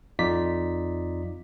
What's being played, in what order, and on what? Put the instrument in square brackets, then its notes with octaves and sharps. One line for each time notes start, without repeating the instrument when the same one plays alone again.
[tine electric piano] F2 D#4 F4 D5 B6